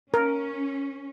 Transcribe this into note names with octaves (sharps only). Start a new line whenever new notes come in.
C#4 A#4